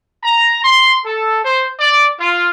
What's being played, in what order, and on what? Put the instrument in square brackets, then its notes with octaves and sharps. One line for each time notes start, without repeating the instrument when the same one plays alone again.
[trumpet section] A#5
C6
A4
C5
D5
F4